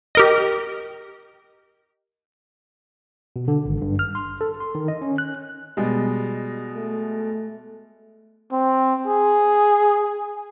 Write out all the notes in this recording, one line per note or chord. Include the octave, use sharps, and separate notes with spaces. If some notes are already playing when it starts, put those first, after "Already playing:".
G4 A#4 D#5
B2
D3
G#1
G2
F6
C6
A4
C6
D#3
D#5
C#4
F#6
B2 G3 G#3
A3
C4
G#4